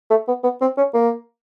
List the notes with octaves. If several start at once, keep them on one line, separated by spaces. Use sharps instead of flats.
A3
B3
B3
C4
C#4
A#3